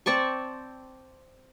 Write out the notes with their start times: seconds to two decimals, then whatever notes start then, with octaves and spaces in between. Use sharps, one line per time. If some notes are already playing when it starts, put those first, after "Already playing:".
0.06 C4 D5 A5 C#6